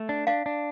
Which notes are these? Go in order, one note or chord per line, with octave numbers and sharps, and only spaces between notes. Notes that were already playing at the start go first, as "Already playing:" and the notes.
Already playing: A3
D4
D4 F5
D4